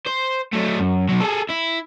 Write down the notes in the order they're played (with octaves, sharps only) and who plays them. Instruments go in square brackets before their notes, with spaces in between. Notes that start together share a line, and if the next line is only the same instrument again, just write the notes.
[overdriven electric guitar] C5
F#3 A3
F#2
B2 F#3
G#4 A4
E4